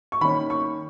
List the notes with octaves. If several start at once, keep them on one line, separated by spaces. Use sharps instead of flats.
C#6
D#3 A#3 C#4 B5
C#6